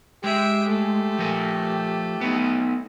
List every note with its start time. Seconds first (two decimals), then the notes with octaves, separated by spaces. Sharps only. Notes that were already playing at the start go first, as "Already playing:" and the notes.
0.24 G#3 G4 E5 G5
0.68 A3
1.19 F3 A#4
2.21 B3 D#4